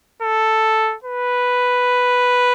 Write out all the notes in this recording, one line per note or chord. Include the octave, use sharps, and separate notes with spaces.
A4
B4